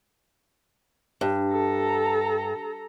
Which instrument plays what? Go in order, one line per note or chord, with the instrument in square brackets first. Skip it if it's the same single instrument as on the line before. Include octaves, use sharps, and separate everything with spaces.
[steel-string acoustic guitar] G2
[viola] A4 A#5